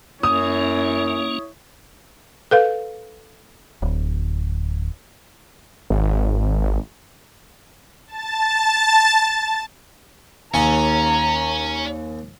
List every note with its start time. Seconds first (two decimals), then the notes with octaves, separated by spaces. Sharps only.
0.23 F#2 A#3 C#4 E4 C#5 D#6
2.51 A4 B4 F5
3.82 D1
5.90 G#1
8.07 A5 A6
10.54 D#2 C#4 G#5 A#5